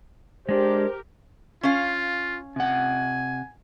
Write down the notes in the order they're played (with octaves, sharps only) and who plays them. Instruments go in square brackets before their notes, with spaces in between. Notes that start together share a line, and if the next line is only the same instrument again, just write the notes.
[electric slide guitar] G#3 D4 [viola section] G4 A#4 [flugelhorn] C5
[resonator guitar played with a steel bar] C#4 F5 [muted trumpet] F4
[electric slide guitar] C3 F#5 [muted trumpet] G#5